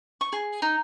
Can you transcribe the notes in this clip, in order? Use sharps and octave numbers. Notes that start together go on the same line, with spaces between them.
C#6
G#4
D#4